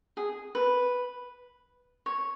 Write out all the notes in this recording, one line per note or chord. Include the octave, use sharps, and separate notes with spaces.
G#4
B4
C#5